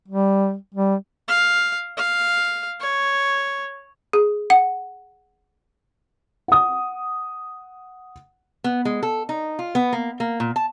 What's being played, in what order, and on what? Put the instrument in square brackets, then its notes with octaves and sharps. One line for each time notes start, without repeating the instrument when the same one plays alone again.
[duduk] G3
G3
[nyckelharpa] F5
F5
C#5
[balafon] G#4
F#5
[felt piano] F#5 D#6
[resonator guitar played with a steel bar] B3
G#3
A4
D#4
F4
B3
A#3
A#3
A#2
A5